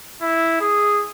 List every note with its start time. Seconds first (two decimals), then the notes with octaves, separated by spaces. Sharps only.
0.22 E4
0.61 G#4